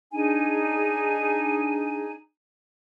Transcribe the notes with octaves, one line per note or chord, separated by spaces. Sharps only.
D4 D#4 G#4 G#5